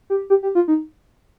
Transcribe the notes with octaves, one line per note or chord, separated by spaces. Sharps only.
G4
G4
G4
F4
D#4